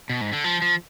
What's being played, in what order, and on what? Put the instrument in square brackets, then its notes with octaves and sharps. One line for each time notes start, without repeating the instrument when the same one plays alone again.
[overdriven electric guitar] B2
G#2
D3
F3
F3